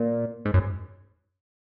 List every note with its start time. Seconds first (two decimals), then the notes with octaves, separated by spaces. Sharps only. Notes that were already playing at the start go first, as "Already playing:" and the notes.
Already playing: A#2
0.45 G#2
0.54 F#2